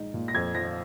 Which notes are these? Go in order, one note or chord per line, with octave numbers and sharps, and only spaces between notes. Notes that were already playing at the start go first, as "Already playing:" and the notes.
Already playing: A#1 G#3 D#4
A#2
A#6
F2 G#6
F3 A#6